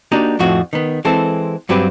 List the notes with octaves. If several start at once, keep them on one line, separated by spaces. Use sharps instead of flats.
A#3 D4 D#4 F#4 G4
F2 A2 F3 C4 F#4
D#3 B3
E3 G#3 C4 A4
G2 F#3 C4 G4 B4